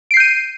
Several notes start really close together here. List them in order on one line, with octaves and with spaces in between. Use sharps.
D7 C7 G6 D#7